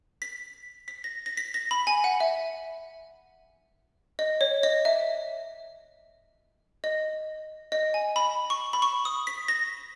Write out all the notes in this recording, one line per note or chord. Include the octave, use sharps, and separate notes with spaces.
B6
B6
A#6
A#6
B6
A#6
B5
G#5
F#5
E5
D#5
C#5
D#5
E5
D#5
D#5
G#5
B5
C#6
B5
C#6
D#6
B6
A#6